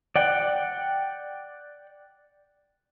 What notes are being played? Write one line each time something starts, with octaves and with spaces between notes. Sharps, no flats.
D5 F#5 G5